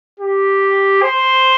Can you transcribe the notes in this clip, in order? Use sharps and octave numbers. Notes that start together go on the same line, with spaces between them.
G4
C5